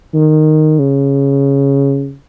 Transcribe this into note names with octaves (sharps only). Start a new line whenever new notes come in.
D#3
C#3